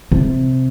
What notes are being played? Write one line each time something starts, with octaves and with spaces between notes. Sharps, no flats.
C3